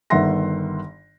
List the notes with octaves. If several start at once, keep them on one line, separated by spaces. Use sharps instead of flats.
G1 D#3 E5 F#5 C6 A#6